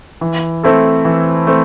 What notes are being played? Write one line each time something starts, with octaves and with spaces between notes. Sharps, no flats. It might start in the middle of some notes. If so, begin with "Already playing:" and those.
E3
A3 C4 E4 A4
E3
A3 C4